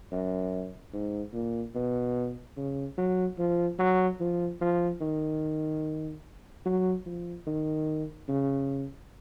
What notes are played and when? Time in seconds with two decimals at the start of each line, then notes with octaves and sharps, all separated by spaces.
0.12 F#2
0.93 G#2
1.34 A#2
1.75 B2
2.57 C#3
2.98 F#3
3.39 F3
3.79 F#3
4.20 F3
4.61 F3
5.01 D#3
6.66 F#3
7.06 F3
7.47 D#3
8.29 C#3